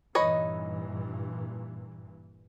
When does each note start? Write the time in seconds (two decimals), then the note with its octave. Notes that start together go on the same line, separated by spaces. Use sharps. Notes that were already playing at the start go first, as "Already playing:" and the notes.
0.15 G2 A#2 E3 D#4 B4 C#5 D#5